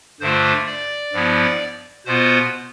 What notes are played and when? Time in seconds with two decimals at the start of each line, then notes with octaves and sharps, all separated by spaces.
0.21 G2 D3 A3 D4 F4 C5
0.67 D5
1.13 G2 F3 B3 E4
2.06 B2 B3 F4 C5